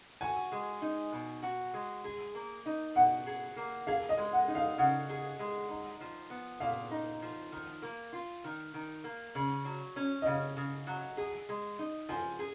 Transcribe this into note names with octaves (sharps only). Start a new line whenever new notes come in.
F#4 G#5
G#3
D#4
B2
F#4
G#3
G#4
A#3
D#4
B2 F#5
G#4
A#3
G#4 F5
D#5
G#3
F#5
D#4
F5
C#3 F#5
G#4
G#3
D#4
F3
B3
A#2 F5
D#4
F3
D#3
A#3
F4
D#3
D#3
A#3
C#3
F#3
C#4
D#5
C#3 F5
C#3
F#3
G#4
G#3
D#4
F3 G#5
G#4